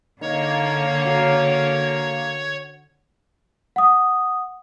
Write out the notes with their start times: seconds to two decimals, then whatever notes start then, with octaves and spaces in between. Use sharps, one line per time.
0.21 D3 A#3 D#4 C#5
1.05 C#4 F#4
3.76 F#5 D#6